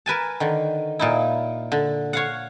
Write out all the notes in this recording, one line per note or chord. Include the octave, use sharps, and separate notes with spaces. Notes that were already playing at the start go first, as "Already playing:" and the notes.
A#4 B4 G#5 A5
D3 D#3
A#2 D#4 E4
D3
C#5 F5 F#5